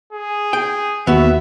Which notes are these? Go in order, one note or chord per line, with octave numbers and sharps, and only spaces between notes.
G#4
G5
D#2 B3 F#4 E5